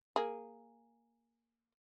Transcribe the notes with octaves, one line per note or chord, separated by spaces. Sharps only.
A#3 G#4